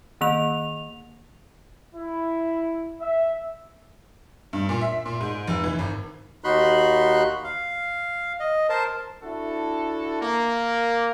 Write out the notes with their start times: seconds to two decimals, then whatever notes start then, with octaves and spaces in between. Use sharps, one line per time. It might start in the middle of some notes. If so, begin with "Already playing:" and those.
0.21 D#3 A#3 F7
1.95 E4
3.00 E5
4.53 G2
4.69 A#2
4.81 E5
5.06 A#2
5.21 G#2
5.47 F1
5.64 E3
5.79 G#1
6.44 D#2 D#4 F#4 B5 C6 F#6
7.44 F5
8.40 D#5
8.69 A#4 C5 A5
9.23 D4 E4 F#4 A4
10.22 A#3